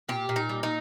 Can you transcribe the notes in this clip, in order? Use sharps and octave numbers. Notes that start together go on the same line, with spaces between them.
A#2 G4
A#2
D#4
G3
D#4